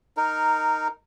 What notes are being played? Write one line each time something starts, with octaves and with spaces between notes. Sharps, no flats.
D#4 A#4